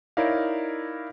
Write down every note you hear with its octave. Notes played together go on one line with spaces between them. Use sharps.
D#4 E4 A#4 C#5 D5 F5